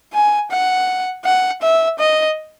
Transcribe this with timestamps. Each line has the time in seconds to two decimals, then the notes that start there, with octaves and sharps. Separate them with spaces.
0.13 G#5
0.51 F#5
1.25 F#5
1.62 E5
1.99 D#5